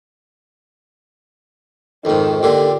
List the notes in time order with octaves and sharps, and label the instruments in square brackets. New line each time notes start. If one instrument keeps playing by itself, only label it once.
[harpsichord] F2 G#2 [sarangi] D#3
[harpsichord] A#2 D3 [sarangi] G4